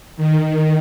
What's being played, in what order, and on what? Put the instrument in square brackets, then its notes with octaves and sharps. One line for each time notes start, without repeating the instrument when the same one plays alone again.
[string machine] D#3